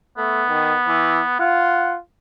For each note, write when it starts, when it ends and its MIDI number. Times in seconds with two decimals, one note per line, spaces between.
0.18 0.43 57
0.18 1.36 59
0.49 0.75 51
0.87 1.19 52
1.40 1.98 65
1.40 1.93 78